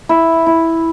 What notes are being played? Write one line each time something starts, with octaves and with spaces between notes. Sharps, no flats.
E4
E4